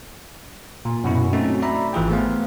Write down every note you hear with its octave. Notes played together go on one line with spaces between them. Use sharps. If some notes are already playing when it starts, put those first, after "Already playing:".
A#2
F#2 B2 E4
A3 C4 C#4 D#4 F#4 A4
D5 E5 A#5 B5
G#1 E3 F4 G#4 G5
A3 B3 C5 F5